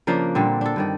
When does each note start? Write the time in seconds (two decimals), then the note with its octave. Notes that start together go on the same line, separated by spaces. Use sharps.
0.07 C#3 F3 A#3 D4
0.35 A#2 D3 G3 C4
0.61 D4 A4
0.76 G2 D#3 D5